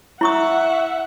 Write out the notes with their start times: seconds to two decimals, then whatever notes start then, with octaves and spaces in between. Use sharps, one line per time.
0.21 E4 E5 F#5 C#6 D#6